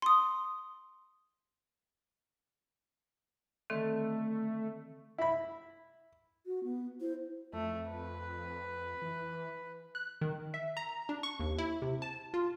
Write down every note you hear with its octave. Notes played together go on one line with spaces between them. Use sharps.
C6 D#6
D3 D#3 A3 C4
E4 B5
F#4
B3
E4 C5
F2 A3
B4
E3
F#6
D#3
E5
A#5
D4
C#6
D#2
E4
C3
A5
F4